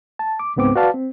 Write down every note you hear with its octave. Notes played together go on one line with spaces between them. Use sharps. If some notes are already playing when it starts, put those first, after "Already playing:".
A5
D6
C#2 G#2 B3 C4 D6
F#4 B4 D5 F5 A5
C4